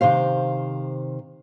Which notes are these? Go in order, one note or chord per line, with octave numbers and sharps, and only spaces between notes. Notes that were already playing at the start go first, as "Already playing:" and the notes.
C3 D#3 C5 F5